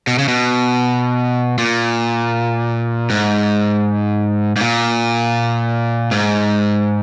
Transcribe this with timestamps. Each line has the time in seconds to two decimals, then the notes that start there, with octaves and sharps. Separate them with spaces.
0.07 B2
0.18 C#3
0.28 B2
1.58 A#2
3.10 G#2
4.56 G#2
4.61 A#2
6.11 G#2